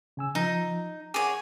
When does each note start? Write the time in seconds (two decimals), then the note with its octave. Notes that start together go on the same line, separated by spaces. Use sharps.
0.17 C#3 G#5 E6
0.35 F3 D#4
1.14 G#4 C#5 F#5 D6